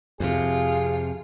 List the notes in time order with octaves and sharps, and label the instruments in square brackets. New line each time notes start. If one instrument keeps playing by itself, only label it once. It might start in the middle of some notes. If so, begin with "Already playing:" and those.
[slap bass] F2 C3 [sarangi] F4 [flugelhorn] G#4